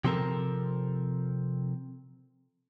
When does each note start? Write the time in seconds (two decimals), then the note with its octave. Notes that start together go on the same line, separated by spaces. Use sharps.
0.04 C3 F3 C4 A4 A#4